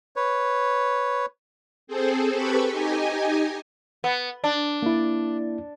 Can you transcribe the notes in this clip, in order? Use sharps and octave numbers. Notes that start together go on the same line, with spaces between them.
B4 C#5
C4 G#4 A4 C5
G4 A4 B4 B5 C#6
D#4 G4 D#5 G#5
B3
D4
A#3 E4